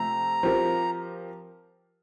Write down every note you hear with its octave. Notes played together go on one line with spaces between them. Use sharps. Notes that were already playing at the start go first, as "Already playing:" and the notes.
Already playing: C3 F3 A3 C4 A#5
F3 C4 G4 A#4